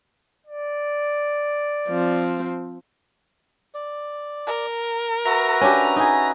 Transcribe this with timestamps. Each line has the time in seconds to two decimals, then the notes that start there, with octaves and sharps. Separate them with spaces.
0.47 D5
1.88 F3 C4
3.75 D5
4.47 A#4
5.25 F#4 B4 E5 A#5
5.61 C#4 D4 G4
5.96 D#4 G#4